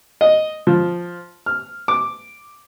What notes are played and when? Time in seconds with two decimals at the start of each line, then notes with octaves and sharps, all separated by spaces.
0.21 D#5
0.67 F3
1.46 F6
1.88 D6